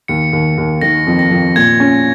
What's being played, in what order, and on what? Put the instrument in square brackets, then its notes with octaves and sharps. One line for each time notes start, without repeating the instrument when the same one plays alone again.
[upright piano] D#2 [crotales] C#7
[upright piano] D#2
D#2
[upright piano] D#3 [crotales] A#6
[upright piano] F2
[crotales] A#6
[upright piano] F2
[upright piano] A#2 [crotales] G#6
[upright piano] C#4